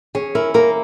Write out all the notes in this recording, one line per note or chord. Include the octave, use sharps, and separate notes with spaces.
C#4 G#4
E4 A#4
A#3 A#4